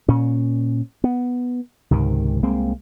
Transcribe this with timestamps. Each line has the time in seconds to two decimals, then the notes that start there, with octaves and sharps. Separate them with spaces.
0.08 A#2 C#4
1.04 B3
1.91 C#2 G#2 C3 D#3
2.43 C2 G#3 A#3 C4